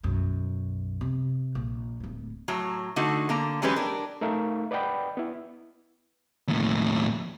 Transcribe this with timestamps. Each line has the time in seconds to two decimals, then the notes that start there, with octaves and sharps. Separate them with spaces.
0.03 B1 F#2
1.01 C3
1.55 A#1
2.00 D1 A2
2.48 A2 F#3 A#5
2.96 D3 A3 D#4 F#4
3.29 D3 A#3 A#5
3.62 E3 F#3 G#3 C#4 G4 B4
3.76 D4 A#4
4.21 A3 D#4 A4 A#4 E5 F5
4.71 B4 D5 D#5 F#5 G5 B5
5.17 B3 E4
6.48 D#2 A2